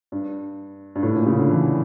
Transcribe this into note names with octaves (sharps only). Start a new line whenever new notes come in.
G2
G2
A2
A#2
C#3
D3
E3